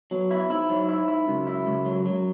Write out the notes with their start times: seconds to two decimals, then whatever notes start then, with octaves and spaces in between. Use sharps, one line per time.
0.11 B2 F#3
0.31 E4
0.50 G#2 E4
0.69 F#3
0.89 E4
1.08 E4
1.27 C#2 F#2
1.47 E4
1.67 C#2
1.86 F#3
2.06 F#3